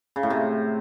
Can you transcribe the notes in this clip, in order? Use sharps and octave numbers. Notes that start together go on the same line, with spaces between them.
C#3
A2
C3